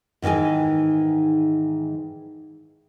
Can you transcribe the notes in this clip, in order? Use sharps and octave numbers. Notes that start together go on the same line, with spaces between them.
G#2 D#3 E3 G#3 G#5